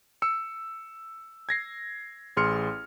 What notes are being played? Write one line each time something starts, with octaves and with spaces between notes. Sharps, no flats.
E6 C#7
G#6 A#6 C7
A1 G#4 C6 F6 C#7